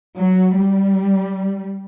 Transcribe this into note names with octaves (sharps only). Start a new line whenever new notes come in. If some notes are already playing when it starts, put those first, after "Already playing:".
F#3
G3